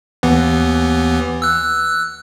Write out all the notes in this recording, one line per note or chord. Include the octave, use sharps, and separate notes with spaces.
D#2 E3 B3
E6 F#6